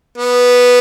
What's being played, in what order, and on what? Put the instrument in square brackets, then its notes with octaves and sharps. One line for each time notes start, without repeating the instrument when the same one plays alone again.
[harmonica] B3